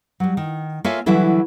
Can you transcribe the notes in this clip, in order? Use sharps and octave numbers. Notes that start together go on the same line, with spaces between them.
F#3 G3
D#3
A#3 F4 A4 C#5 E5 G#5
D3 E3 F#3 G3 E4 A4